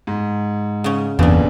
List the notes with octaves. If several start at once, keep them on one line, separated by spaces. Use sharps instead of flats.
G#2
C#3 C#4
G1 E2 A#2 C#3 E3 B3 D4